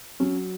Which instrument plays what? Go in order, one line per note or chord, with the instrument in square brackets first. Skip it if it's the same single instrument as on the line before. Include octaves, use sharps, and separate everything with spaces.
[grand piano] F#3 [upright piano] C#4